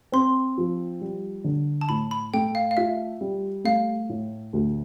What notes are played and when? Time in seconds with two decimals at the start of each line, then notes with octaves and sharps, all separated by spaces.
0.12 C4 C6
0.58 F3
1.01 G3
1.44 D3
1.81 A5
1.89 A2 B5
2.11 B5
2.34 A3 G5
2.55 F5
2.71 F5
2.77 F4 E5
3.21 G3
3.64 A3 F5
4.09 A2
4.53 D2